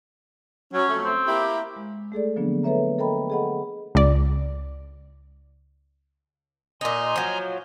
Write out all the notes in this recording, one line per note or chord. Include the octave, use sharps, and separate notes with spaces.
F#3 C#4
F2 F#3 A3
C4
A#3 E4 G4
G#3
A3 G#4 A4 D5
D3 F3 F#3 A#3 B3 D4
A4 B4 C#5 E5 A#5
A4 A#4 D#5 G5 A#5 B5
G#4 A4 D#5 F#5 B5
C#2 D5
A#2 D#4 G#5 A#5 C6
F3 F#3